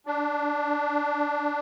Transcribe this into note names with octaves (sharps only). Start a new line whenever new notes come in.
D4